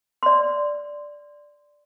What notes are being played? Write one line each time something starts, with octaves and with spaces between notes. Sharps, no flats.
D5 C6